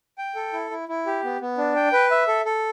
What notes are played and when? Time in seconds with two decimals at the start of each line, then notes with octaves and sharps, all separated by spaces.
0.18 G5
0.35 A4
0.53 E4
0.71 E4
0.89 E4
1.06 G4
1.24 B3
1.41 B3
1.58 D4
1.76 G5
1.93 B4
2.11 E5
2.28 A4
2.45 A4